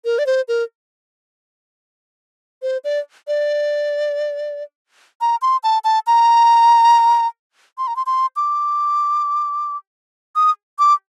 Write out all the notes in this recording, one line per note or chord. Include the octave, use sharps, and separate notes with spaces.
A#4
D5
C5
A#4
C5
D5
D5
A#5
C6
A5
A5
A#5
C6
A#5
C6
C6
D6
D#6
D6